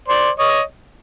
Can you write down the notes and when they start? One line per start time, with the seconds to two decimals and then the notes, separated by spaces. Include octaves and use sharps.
0.08 C5 D5
0.39 C#5 D#5